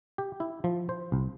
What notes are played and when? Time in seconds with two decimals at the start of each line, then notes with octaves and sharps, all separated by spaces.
0.18 G4
0.40 E4
0.64 F3
0.89 C5
1.12 C2